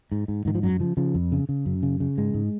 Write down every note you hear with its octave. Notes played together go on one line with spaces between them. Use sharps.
G#2
G#2
G#2 D#3
F3
F#2 F#3
C#3 F3
C#3 F3
F2
C#3
C#3
F#2
C#3
C#3
G#2 G#3
G#2